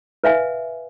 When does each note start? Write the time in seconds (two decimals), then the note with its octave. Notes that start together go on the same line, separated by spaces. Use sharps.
0.24 B4 E5 F5 G#5